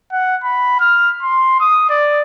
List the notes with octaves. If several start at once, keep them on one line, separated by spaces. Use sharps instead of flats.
F#5
B5
F6
C6
D#6
D5